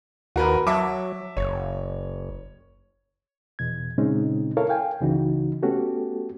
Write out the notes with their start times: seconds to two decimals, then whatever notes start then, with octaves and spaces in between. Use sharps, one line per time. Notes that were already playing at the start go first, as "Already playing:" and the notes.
0.36 D#2 F#4 A#4 B4
0.67 F#3 E5 A5 D6
1.37 F#1 C#5
3.59 E2 B2 G#6
3.98 A#2 C#3 G#3 C4 C#4 D#4
4.57 E4 A4 A#4 C#5 F5
4.69 F5 G5 G#5
5.00 C#2 C#3 E3 D#4 F#4
5.63 A3 B3 C#4 F#4 G4 A4